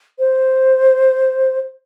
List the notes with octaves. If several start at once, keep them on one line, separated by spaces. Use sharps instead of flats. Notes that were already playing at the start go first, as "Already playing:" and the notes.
C5